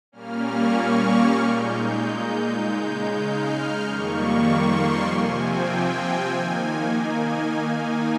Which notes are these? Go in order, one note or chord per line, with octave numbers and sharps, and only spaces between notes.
A#2 G3 A#3 C#4 F6
C#6
F6
A#2 G#3 D#4 G6
G6
C#3 G#3 D#4
F6
F2 D#3 G3 A#3 C#6
C6
C3 F3 C4 G#5
G5
G#5
D#3 A#3 D#4
G#5